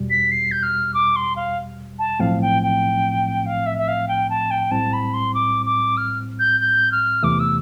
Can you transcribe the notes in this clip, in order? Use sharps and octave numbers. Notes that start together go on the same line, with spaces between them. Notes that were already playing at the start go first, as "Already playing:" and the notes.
Already playing: E2 B2 G3
B6
C7
G6
F6
D6
C6
F5
A5
B1 A2 F3 A3 C4 F5
G5
G5
F5
E5
E5
F5
G5
A5
G5
B1 A2 G3 C4 A5
B5
C6
D6
D6
F6
G6
G6
F6
E2 C3 E3 A3 D6
E6